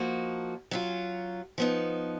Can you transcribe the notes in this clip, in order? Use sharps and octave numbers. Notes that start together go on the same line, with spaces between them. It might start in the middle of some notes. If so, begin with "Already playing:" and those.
Already playing: F3 A#3 D#4 F#4
F#3 C#4 F4
F3 B3 D#4